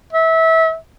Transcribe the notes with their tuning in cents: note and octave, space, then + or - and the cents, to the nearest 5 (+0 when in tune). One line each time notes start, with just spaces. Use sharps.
E5 -25